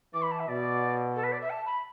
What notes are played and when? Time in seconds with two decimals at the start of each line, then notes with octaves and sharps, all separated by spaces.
0.14 E3 D6
0.22 B5
0.31 A5
0.39 E5
0.48 B2 D5
1.16 A4
1.24 B4
1.32 D5
1.42 E5
1.50 A5
1.66 B5